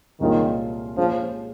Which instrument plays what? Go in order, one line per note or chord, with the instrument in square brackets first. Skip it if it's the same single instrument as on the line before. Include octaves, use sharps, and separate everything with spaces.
[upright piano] C2 A#2 G#3 C#4 F4 [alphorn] D#3
[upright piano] A#2 G#3 C#4 G#4 [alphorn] F3